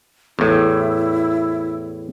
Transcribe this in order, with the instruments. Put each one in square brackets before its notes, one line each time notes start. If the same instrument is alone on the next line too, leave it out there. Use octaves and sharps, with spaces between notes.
[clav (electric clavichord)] E2 A2 [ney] E4